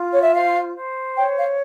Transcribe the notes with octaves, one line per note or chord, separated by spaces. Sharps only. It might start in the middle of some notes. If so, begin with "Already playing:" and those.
Already playing: F4
C#5
E5
C5 F5
C5
C#5 G5
F5